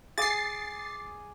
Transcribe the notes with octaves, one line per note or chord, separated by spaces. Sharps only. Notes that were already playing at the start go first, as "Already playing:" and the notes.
G#4 D6 D#6 A6 C7